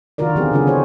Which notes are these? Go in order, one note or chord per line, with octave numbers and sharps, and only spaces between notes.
D3 D#3 F4 F#4 A#4 D5
D3 F3 B3 C4 G4 G#4
C#3 F#3 C#4 D4 F4 G#4
C4 C#4 E4 G#4 C5 C#5